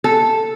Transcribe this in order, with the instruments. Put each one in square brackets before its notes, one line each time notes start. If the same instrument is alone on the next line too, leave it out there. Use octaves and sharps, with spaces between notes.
[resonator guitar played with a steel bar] A4